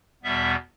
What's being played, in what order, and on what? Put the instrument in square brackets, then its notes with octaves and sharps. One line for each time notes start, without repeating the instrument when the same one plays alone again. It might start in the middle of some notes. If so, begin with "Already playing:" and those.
[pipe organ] E2 B2 G3 B3 E5